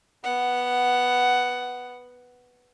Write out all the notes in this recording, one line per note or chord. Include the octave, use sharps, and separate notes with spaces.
B3 F#5